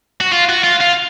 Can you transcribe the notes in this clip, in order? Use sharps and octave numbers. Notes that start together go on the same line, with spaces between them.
F#4
F4
F#4
F4
F4